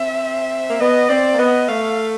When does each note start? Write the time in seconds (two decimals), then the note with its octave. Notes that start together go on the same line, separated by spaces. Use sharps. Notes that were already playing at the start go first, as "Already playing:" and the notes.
Already playing: C4 E5
0.70 A#3
0.80 B3 D#5
1.09 C4 D5
1.34 A#3
1.38 B3 D#5
1.68 A3 F5